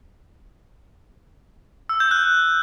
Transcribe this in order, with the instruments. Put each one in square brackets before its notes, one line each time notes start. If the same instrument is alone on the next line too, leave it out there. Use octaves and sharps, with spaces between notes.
[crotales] E6
G6
F#6